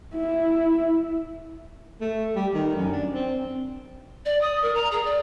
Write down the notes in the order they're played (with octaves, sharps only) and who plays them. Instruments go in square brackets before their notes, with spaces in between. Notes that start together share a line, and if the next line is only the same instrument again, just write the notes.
[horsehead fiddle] E4
[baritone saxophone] A3
G3
D#3
F#2
D4
C4
[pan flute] D5
D#6
A#4
A#5
G#4
D5